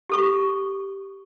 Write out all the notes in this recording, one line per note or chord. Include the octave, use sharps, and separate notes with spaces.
G4 A4 C#6